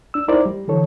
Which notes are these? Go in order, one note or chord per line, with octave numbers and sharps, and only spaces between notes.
D4 E6
D#4 E4 A#4 C5 D5
G3
D3 E3 A4 C#5